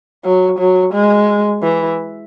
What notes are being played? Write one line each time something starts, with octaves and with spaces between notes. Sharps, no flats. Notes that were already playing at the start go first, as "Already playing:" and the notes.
F#3
F#3
G#3
E3